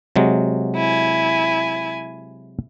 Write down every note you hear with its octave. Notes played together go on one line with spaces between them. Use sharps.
C3 F#3 G#3
E4 G#5